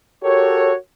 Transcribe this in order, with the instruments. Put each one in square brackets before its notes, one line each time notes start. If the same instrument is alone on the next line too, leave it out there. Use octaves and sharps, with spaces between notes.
[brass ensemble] F#4 G4 A4 A#4 C#5